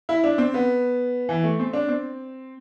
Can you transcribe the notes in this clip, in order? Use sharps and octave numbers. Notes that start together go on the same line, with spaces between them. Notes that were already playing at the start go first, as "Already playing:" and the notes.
E4
D4
C4
B3
E3
A3
C4
D4
C4